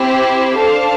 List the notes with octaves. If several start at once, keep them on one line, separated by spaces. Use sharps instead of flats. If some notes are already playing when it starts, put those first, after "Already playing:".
Already playing: C4 E4 G4 C5
D4 A4 C5 F5 A5